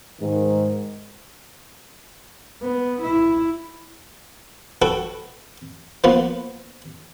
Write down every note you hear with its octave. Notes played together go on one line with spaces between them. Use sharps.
G#2 D#3
B3
E4
F#4 A4 B4 F#5 G5
F3 A#3 B3 F4 B4